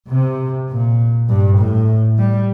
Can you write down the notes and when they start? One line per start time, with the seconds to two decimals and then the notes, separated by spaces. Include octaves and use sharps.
0.10 C3
0.69 A#2
1.29 G2
1.59 A2
2.18 G3